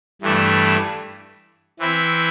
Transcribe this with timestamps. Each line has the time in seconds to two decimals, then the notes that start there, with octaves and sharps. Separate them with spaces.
0.21 G2 E3 A3 D4
1.79 E3 C4 E4